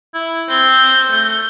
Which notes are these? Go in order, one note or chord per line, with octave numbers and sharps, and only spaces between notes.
E4
C4 G6
A3